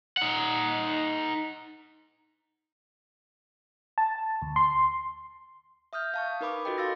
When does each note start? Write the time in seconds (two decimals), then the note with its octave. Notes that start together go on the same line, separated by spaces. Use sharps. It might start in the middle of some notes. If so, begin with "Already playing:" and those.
0.17 D#4 F#5
3.98 A5
4.42 D2
4.56 C6
5.93 E5 D#6 F6 G6
6.14 F5 A5 C#6
6.41 D#4 A#4 B4 B5 D6
6.65 F4 F#4 A4 D#5 G5
6.78 F5 C6 E6 A6 A#6